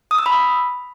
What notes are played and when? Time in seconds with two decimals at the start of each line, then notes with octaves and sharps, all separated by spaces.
0.11 D#6
0.18 E6
0.26 B5